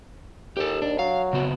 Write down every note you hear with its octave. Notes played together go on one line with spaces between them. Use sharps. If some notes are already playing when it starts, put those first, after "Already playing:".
D#2 G4 A4
D4
F#3 F5
C#3 B3 F#4